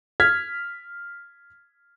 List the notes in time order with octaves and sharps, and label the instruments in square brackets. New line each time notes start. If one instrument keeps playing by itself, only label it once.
[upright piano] F6 G#6 B6